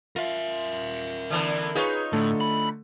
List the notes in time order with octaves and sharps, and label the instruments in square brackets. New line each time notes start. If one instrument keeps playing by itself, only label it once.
[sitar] F4 [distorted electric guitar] A#4 E5
[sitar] D3 E3 B3
[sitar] D#4 F4 C#5 [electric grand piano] G#4 B4 C#6
[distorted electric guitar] A2 [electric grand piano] D3 A3 A4
[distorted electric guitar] B5